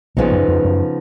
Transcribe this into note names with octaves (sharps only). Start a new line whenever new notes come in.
A#1 A#2 C#3 F3 B3 D#4
F#2
F2
F#2